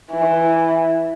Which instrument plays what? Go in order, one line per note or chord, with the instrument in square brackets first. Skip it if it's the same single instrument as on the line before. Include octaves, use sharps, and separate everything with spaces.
[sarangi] E3